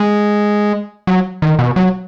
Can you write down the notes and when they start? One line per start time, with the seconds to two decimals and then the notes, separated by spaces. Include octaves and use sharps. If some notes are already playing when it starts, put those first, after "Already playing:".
Already playing: G#3
1.07 F#3
1.42 D#3
1.59 B2
1.76 F#3